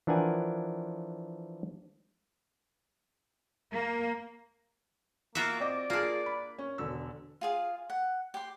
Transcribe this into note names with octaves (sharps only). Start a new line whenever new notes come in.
E3 F3 D4 A#4 F#5 G#5
A#3
A#3 F4 F#4 E5
C4 D5 D#5 D6
A#3 D4 F4 G#4
B5
C#4
E1 D3 E6
F4 G#4 F5
F#5
G4 C6